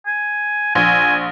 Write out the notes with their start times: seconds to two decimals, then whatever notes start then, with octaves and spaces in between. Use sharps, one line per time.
0.07 G#5
0.75 A#1 G#5